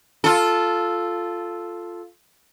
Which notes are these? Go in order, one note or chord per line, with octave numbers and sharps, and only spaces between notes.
F4 A4